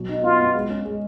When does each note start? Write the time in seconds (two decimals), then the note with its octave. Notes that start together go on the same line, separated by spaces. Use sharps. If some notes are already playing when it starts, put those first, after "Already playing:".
Already playing: B2 F#3
0.09 D#4
0.23 B3 F4
0.39 B3
0.55 G#3
0.70 C#4
0.85 G#3